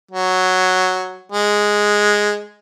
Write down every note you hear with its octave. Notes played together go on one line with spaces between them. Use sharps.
F#3
G#3